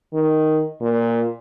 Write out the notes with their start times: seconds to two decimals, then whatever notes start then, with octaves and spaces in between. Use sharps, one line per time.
0.14 D#3
0.81 A#2